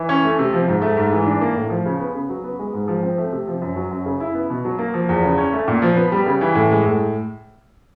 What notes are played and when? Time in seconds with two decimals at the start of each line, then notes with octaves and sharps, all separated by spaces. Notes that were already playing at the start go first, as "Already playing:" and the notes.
Already playing: E3
0.09 C#4
0.24 A3
0.39 C3
0.53 F3
0.68 G#2
0.82 A3
0.97 G#2
1.12 E3
1.26 D4
1.41 A#3
1.55 A2
1.70 F3
1.85 C#3
2.00 B3
2.14 C#3
2.29 F#3
2.44 B3
2.59 G#3
2.73 G#2
2.88 F3
3.03 C4
3.18 A3
3.32 C3
3.47 F3
3.62 F#2
3.76 F#3
3.92 F#2
4.06 C#3
4.20 E4
4.34 B3
4.50 B2
4.65 F#3
4.79 A#3
4.94 F3
5.09 E2
5.23 C#3
5.38 C#4
5.53 A3
5.68 A#2
5.82 F3
5.96 B3
6.12 G3
6.26 C#3
6.41 E3
6.55 A2
6.71 G#3
6.85 A2